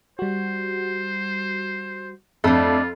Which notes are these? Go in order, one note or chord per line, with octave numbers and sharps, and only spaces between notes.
G3 F#4 C5
F2 A3 D4 F4